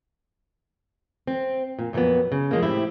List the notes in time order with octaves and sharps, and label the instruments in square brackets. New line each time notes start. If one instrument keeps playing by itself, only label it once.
[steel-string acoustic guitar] C4
A#2
F2 A#2 E3 F#3 B3
C#3
F3 G#3 A#3
A2 C4 E4 G4